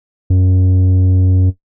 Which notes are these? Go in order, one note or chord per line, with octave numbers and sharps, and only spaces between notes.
F#2